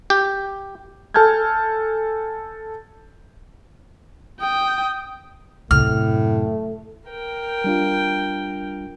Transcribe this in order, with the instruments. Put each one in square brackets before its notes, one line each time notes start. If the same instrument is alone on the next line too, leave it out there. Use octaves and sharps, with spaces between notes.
[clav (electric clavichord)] G4
[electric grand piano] A4 G#5 A5 F6 G6 G#6
[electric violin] G5 [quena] D#6
[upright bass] F#2 C3 [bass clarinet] A2 [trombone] A3 [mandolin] F6
[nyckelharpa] A#4 G5
[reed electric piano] G3 D4 F4